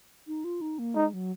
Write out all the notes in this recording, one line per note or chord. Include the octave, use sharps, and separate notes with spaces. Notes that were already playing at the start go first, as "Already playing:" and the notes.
D#4
F4
D#4
A#3
G#3 D#4
F#3